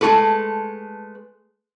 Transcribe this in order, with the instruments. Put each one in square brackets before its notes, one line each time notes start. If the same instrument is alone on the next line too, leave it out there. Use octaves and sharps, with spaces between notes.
[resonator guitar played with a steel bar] G#3 A3 F4 F#4 A4 B4